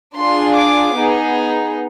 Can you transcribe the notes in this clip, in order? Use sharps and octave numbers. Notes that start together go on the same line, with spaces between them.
D4 F4 G#4 C6
D6
B3 D#4 G#4